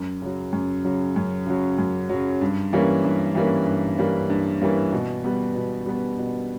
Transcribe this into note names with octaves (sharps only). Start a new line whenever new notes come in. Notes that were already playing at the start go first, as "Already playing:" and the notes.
Already playing: F#2
C#3 F#3
F#2
C#3 F#3
F#2
C#3 F#3
F#2
C#3 F#3
G2
E3 G3 A#3 C#4
G2
E3 G3 A#3 C#4
G2
E3 G3 A#3 C#4
G2
E3 G3 A#3 C#4
B2
G3 B3
B2
G3 B3
B2